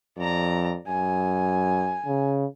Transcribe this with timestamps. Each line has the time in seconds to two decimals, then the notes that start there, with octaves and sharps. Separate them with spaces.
0.18 F2 D5 A#5
0.88 F#2 G#5
2.06 C#3